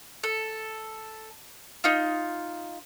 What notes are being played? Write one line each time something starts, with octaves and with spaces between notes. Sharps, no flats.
A4
D#4 F4